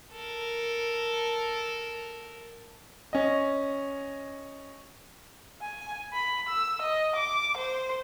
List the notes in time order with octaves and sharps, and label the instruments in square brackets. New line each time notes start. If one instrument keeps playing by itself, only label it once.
[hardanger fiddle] A4 A#4
[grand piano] C#4 D#5
[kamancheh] G#5
B5
E6
D#5
D6
C5